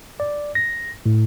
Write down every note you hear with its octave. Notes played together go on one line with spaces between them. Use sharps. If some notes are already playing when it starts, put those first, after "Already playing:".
D5
A#6
A2